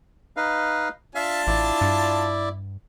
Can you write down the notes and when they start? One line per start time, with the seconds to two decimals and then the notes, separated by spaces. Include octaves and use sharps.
0.37 D#4 B4 F5
1.15 D4 F4 E5 F5 A5
1.47 A1 E4 D5
1.81 G2